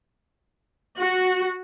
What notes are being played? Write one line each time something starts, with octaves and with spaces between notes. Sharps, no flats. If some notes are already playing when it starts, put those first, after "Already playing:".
F#4